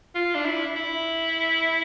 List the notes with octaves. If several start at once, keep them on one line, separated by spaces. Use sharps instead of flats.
F4
D4
E4
E4